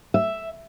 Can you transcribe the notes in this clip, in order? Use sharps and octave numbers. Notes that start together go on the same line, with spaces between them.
E5